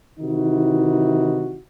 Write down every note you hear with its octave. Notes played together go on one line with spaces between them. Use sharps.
C3 D#3 E3 D#4 E4 F#4